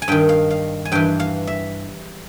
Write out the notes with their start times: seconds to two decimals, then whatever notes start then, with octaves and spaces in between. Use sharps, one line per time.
0.02 G#5
0.08 G2 D#3 G5
0.29 F5
0.50 F5
0.85 G#5
0.92 G2 E3 G5
1.20 F5
1.47 E5